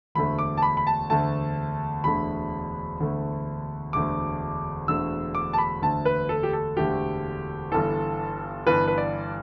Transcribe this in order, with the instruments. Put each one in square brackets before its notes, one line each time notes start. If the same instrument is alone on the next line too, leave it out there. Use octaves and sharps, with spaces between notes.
[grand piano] E1 D2 D3 A3 B5
D6
A5
B5
B5
A5
E1 D2 D3 A3 A5
E1 D2 D3 A3 B5
E1 D2 D3 A3
E1 D2 D3 A3 D6
E1 D2 D3 A3 E6
D6
A5
B5
E1 D2 D3 A3 A5
B4
A4
G4
A4
E1 D2 D3 A3 G4
G1 G2 E3 A4
G1 G2 E3 B4
B4
D5